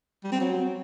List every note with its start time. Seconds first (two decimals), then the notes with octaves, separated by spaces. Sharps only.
0.24 G3
0.32 C4
0.40 F#3